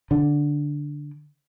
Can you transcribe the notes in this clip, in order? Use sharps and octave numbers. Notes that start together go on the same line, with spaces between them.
D3